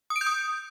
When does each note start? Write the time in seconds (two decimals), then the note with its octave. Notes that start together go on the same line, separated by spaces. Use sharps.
0.10 D#6
0.16 D7
0.21 G6
0.26 D#6